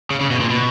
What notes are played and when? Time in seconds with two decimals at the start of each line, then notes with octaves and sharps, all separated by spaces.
0.11 C#3
0.21 C#3
0.31 B2
0.40 A#2
0.50 B2